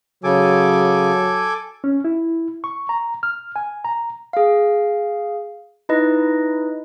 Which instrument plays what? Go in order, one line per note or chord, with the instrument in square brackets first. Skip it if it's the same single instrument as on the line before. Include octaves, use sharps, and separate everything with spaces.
[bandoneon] C#3 [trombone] F#3 [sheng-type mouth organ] A4 G#5 D6
[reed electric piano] C#4
E4
C#6
A#5
F6
G#5
A#5
[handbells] G#4 F5
D#4 E4 B4 D#5